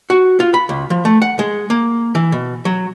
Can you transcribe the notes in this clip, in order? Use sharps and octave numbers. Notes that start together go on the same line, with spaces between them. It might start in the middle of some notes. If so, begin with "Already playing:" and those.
F#4
F4
B5
C#2
F3
A3
F#5
G#3
A#3
E3
B2
F#3